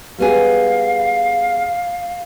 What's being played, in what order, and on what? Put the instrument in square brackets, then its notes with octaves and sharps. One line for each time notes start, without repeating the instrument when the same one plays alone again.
[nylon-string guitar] G3 B3 G#4 [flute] F5